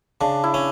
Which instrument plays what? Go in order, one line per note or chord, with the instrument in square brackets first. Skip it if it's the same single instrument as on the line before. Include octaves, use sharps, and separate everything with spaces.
[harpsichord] C#3 [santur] D4
[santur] E4
[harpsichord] C#4